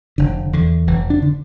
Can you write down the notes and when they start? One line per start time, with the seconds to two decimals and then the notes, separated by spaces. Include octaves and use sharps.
0.18 F1 D3
0.53 E2 D3
0.87 F1 E3
1.10 D4
1.22 D3